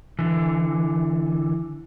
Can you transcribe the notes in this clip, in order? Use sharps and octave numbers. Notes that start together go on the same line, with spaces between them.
D3 E3